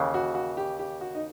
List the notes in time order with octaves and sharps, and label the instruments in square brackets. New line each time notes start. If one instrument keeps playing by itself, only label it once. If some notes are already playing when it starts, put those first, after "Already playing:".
Already playing: [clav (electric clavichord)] D#2 C#3 E3
[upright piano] F#4
F#4
G4
G4
F#4
D#4